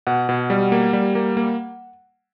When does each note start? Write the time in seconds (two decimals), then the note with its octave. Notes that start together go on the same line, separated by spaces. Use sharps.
0.07 B2 F#5
0.29 B2
0.50 G3
0.72 A#3
0.93 G3
1.15 A#3
1.37 A#3